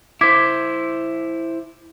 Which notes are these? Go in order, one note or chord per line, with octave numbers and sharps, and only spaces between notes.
E4 C5 D6 G#6 B6